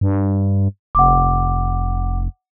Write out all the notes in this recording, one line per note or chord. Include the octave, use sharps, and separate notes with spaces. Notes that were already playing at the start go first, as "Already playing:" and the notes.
G2
F1 F#5 D6